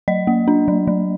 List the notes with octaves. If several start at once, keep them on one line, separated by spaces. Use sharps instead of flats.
F#3 D#5
A#3
D4
F#3
F#3